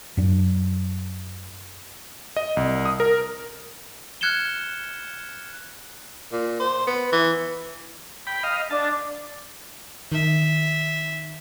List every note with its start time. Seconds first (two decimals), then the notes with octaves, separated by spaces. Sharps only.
0.17 F#2 F#3 D4
2.36 D#5
2.57 C2
2.86 D#6
3.00 A#4
4.21 F6 F#6 G#6 C#7 E7 G7
6.32 A#2
6.60 C5
6.87 B3
7.13 E3
8.27 G5 B5
8.43 D#5 F5
8.70 D4 A5
10.12 D#3 E5